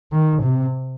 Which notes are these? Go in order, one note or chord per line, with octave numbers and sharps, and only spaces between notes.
D#3
C3